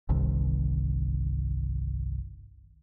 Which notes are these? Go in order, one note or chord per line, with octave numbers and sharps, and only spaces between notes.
G1 C2 C3 D#3